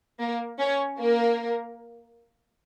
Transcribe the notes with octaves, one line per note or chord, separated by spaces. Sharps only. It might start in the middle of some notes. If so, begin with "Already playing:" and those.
A#3 A#4
C#4 C#5
A#3 A#4